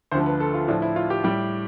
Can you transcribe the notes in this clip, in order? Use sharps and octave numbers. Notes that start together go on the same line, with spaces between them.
D2 D3 F3 C5
B4
A4
F4
A2 F3 D4
E4
F4
G4
A2 G3 G4